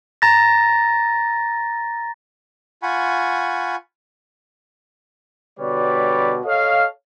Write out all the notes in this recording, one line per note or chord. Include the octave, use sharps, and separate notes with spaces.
A#5 A6 A#6
F4 F#5 G#5 B5 C#6
B2 D3 G3 B4 C#5 D5
A4 C#5 D#5 F5